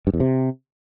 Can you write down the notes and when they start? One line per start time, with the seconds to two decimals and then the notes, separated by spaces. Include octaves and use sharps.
0.07 G2
0.14 E2
0.20 C3